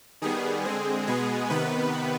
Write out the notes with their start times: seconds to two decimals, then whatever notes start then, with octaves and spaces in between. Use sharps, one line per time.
0.22 D#3 G3 B3 G#4
0.65 D3 G#3 C4
1.07 B2 G#3 B3 G#4
1.50 C3 D#3 B3 B4